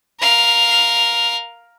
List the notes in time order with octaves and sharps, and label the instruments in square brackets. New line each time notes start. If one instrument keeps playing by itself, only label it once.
[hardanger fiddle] A#4 F5